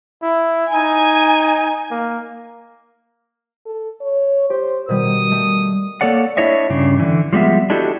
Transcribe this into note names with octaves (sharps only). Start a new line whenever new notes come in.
E4
D#4 G#5
A#3
A4
C#5
G4 C5
B2 D#3 G3 A#4 D#6
G3 A3
A#3 A4 C#5 D5 F#5
D4 E4 C#5 D#5 E5
G2 C#3 D4
D3 E3
F3 G3 G#3 B3 E5
D4 E4 F#4 G4 A4 D#5